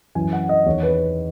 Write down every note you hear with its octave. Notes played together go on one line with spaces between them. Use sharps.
F#2 E3 G#5
F#5
D#5
E2 D#3 C#5
B4